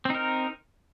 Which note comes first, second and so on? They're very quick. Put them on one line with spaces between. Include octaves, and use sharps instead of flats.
C4 D#4 A#4